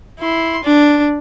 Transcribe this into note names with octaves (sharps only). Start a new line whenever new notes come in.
E4 C6
D4